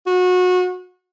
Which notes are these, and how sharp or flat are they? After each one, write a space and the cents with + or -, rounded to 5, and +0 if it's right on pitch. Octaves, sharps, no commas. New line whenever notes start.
F#4 -30